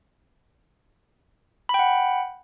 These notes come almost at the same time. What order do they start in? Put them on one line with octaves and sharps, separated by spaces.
B5 G5 F#5